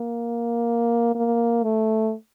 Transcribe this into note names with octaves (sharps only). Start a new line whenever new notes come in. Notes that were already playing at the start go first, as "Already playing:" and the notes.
Already playing: A#3
A#3
A3